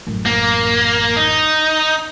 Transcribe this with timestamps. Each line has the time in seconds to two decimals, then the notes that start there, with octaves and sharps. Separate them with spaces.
0.07 A1 F#2
0.25 A#3
1.16 D#4